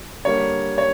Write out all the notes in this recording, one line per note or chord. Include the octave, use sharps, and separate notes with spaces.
D3 G3 A#3 C#5
C#5